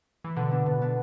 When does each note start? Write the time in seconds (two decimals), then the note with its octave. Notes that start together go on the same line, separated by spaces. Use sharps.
0.24 E3
0.36 B2 D3
0.51 B3 D4
0.66 B2
0.82 B3 D4